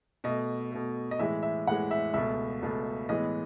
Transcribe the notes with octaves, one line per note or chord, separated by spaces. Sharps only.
B2 A3 D#5
B2 A3
D#5
A2 E3 G#3 E5
E5
A2 E3 G#3 F#5
E5
C#2 B2 A3 E5
C#2 B2 A3
A2 E3 G#3 B3 D#5